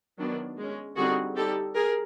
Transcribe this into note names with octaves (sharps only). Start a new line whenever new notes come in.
D#3 F#3 B3 D4
G#3 C#4
D3 G3 C4 D#4 F#4 G#4
G3 C4 D#4 G4 A4
G#4 A#4